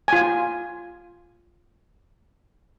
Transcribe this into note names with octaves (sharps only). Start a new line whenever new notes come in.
F4 G#5